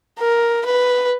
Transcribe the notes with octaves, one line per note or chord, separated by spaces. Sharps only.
A#4
B4